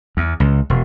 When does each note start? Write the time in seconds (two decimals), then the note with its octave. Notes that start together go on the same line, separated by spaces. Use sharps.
0.17 E2
0.40 C#2
0.70 E1